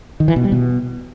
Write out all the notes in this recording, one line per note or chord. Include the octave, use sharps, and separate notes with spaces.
D#3
E3
B2
G3
B2